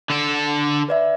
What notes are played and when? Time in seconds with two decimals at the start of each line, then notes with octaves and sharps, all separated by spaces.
0.10 D3 A4
0.88 B4 D5 E5